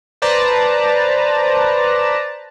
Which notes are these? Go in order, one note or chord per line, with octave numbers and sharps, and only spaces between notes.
B4 C5 D5 A5 A#5